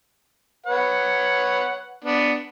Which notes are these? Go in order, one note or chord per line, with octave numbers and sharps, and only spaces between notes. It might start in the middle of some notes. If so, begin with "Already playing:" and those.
B4 C#5 F#5
B3 D4